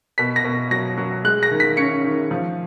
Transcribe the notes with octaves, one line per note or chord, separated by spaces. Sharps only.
B2 B6
A#6
B2
F#3 A#6
F#3
G#3 F#6
A#6
D#3
B6
C#4 C#7
D#3
F3